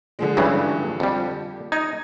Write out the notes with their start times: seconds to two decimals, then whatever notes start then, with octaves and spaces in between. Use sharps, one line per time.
0.19 D3 F3 G#3
0.37 G2 C#3 E3
1.00 F2 G3
1.72 D#4 G#6